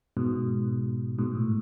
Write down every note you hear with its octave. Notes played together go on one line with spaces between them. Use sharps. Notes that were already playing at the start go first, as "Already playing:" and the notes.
G#2 B2
G#2 B2
A2